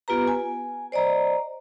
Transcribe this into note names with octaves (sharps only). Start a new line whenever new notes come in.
B3 F4 G4 B4 A#5
G#5
C5 D5 D#5 A#5